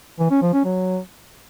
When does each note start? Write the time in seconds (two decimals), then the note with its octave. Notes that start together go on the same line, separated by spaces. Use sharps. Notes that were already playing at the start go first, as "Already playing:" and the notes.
0.19 E3
0.31 C#4
0.42 F3
0.53 C#4
0.65 F#3